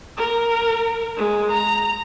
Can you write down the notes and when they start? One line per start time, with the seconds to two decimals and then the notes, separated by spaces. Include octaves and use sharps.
0.17 A#4
1.17 G#3
1.51 A#5